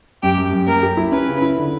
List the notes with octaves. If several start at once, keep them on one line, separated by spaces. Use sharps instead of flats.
F#2 G4
F#2
F#2
A#3 A#4
G4
E4
C#4 B4
C#3
E4
D3